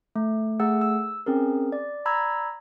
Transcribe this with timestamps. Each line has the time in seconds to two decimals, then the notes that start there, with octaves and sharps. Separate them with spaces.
0.16 A3
0.60 A3 G#4 F#5 E6
0.81 E6
1.26 C4 C#4 G#4 A#4
1.72 D5
2.05 D5 A#5 B5 E6 G#6